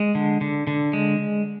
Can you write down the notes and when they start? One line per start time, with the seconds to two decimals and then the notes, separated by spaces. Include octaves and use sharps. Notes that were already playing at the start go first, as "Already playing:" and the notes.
Already playing: G#3
0.15 D3
0.41 D3
0.67 D3
0.93 G#3